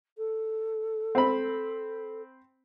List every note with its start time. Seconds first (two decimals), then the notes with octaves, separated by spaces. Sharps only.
0.17 A4
1.15 C4 C5 B5